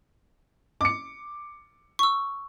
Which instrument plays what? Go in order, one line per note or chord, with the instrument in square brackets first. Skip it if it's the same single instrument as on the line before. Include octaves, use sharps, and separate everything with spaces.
[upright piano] D6 C#7
[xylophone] C#6 E6